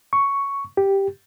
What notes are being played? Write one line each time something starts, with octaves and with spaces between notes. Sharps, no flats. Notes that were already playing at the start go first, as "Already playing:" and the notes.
C#6
G4